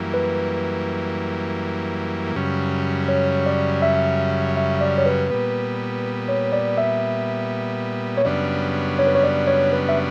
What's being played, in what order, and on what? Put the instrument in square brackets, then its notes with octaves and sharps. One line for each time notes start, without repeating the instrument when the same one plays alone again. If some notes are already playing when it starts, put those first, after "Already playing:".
Already playing: [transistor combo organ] F#2 E3 G3 A#3
[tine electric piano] B4
[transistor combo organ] F#2 C#3 G3
[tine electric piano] C#5
D5
E5
E5
D5
C#5
B4
[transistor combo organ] A#2 G3 B3
[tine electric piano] C#5
D5
E5
C#5
[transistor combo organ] F#2 C#3 G3 B3 D4 [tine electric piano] D5
[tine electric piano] C#5
B4
C#5
D5
C#5
B4
E5